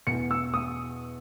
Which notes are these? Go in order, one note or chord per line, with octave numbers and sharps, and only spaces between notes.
E2 B2 C#7
E6
D#6